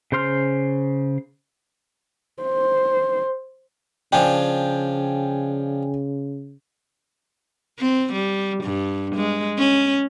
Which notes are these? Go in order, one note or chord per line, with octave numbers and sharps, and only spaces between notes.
C#3 C5 C6 F6
C5
C#3 F3 D4 G5 G#5
C4
G3
G2
G#3
C#4